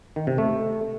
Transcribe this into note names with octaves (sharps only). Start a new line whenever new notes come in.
D#3
C3
A3